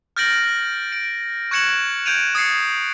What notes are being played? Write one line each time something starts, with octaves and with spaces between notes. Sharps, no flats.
F6 G6 A6 A#6 D7 F#7
D7
C#6 F#6 G#6 C#7 E7 F#7
G6 G#6 D7 D#7 F7
D#6 G#6 A6 C7 C#7